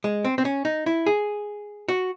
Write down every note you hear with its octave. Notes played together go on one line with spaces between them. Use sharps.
G#3
C4
C4
C#4
D#4
E4
G#4
F#4